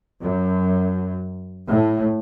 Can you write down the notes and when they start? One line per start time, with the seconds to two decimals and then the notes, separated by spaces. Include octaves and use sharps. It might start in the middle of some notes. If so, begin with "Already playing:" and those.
0.22 F#2
1.67 A2